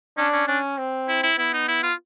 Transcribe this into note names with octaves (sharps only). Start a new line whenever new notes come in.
C#4 D4
C#4
C#4 D4
C4
E4
E4
B3 E4
D#4
E4
F4